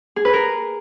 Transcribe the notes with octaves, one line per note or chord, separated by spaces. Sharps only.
G#4
B4
A#4